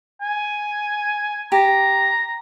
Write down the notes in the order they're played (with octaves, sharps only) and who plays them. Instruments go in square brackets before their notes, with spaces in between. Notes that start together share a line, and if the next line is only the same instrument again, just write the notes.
[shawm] G#5
[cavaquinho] G4 [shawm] A#5